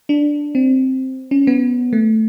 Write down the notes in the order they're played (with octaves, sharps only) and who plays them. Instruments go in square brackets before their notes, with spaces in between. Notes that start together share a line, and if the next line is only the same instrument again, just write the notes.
[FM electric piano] D4
C4
C#4
B3
A3